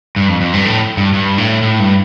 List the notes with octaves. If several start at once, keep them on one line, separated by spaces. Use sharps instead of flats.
G2
F2
F2
G2
A2
G2
G2
A2
A2
G2